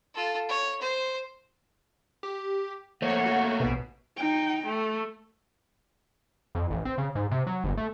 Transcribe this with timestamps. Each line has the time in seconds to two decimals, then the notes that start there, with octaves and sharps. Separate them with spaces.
0.14 F4 A4
0.49 C#5
0.81 C5
2.23 G4
3.02 F3 A3 A#3 C#5 F#5
3.26 F#4
3.60 A#1 B2
4.17 D#4 G5
4.66 A3
6.55 F2
6.70 A1
6.85 C4
6.98 C#3
7.15 G#2
7.31 C3
7.47 F#3
7.64 G1
7.77 A3